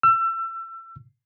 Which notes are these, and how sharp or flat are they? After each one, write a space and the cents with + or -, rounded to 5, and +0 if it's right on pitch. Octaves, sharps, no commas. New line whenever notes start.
E6 +30